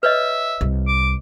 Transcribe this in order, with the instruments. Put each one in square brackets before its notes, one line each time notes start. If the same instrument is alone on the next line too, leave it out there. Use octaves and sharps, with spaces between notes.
[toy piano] B4 C#5 D#5 [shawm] E5
[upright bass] C2
[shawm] D6